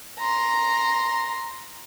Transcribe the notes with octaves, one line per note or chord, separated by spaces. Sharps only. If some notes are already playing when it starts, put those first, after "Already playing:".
A#5 C6